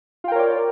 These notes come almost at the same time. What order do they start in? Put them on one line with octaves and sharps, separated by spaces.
F4 G5 A#4 C#5 D5